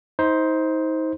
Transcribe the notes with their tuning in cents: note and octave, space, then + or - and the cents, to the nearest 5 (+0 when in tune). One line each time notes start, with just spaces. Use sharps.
D#4 +35 C5 +0